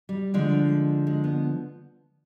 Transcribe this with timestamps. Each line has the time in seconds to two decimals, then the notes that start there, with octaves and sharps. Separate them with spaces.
0.09 G3
0.34 D3 F3 G#3
1.07 G#3
1.24 B3